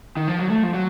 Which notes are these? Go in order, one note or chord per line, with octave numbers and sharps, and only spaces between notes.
D#3
F3
F#3
A3
F3
F#3